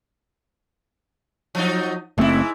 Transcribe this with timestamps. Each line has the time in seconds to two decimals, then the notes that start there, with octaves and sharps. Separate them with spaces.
1.55 F3 F#3 D#4
2.18 F#1 G#2 A3 C4 E4